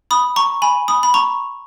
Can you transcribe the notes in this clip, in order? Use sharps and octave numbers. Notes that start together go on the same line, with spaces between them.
B5 D#6
A#5 C#6
G#5 B5
B5 D#6
B5
A#5 C#6